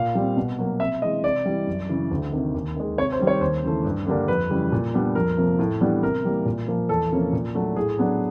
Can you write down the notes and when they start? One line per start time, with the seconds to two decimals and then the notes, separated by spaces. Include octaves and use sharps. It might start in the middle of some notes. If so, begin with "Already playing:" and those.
Already playing: A#2 F5
0.15 G3 C4
0.37 B2
0.58 F#3 A#3
0.80 C3 E5
1.02 E3 G#3 D#5
1.24 C3 D5
1.46 E3 G3
1.67 F#2
1.89 C#3 E3
2.11 D2
2.33 C3 D#3
2.54 D#2
2.76 D#3 G#3
2.98 C3 C#5
3.12 C5
3.20 D#3 G3
3.27 C#5
3.41 D#2 C5
3.63 C#3 E3 A3
3.84 G2
4.06 D3 G3 A#3 D4
4.28 F2 B4
4.50 C#3 E3 G3
4.72 A#2
4.94 G3 B3 D4
5.15 F2 A#4
5.37 C3 F3 A#3
5.59 A2
5.81 E3 G3 B3 D4
6.02 C3 A#4
6.24 E3 G3 A#3
6.45 A#2
6.68 F3 A#3
6.89 E2 A4
7.11 C3 F3 A#3 C#4
7.33 A#2
7.54 F#3 A3 D4
7.76 A2 G#4
7.98 F#3 B3 D4